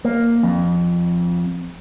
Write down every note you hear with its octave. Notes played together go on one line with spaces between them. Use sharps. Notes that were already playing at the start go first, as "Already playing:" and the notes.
A#3
F2